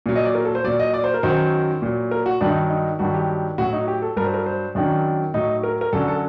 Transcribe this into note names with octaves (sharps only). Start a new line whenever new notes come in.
A#2 F#3
D#5
D5
A#4
A4
C5
A#2 F#3 D5
D#5
D5
C5
A#4
F#2 D#3 F#3 C5
A#2 F#3
A#4
F#4
G2 D#3 F#3 D4
D#4
D#4
G2 D#3 F#3 F#4
G4
A2 F#3 F#4
D#4
G4
A4
G2 F#3 A#4
C5
A#4
C5
F#2 D#3 F#3 D4
A2 F#3 D#4
A#4
A#4
F#2 D3 F#3 A4
A4